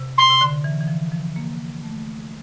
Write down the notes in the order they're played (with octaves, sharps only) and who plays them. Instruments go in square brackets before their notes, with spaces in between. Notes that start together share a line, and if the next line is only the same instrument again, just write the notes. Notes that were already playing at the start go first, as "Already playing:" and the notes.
Already playing: [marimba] C3
[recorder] C6
[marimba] C3
D3
E3
E3
F3
F3
A#3
A3